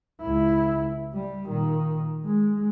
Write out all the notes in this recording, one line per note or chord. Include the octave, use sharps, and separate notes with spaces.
C#2 E4
G3
A#2 D#3
G#3